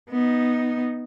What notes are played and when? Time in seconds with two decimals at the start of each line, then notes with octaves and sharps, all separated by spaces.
0.10 B3 D#4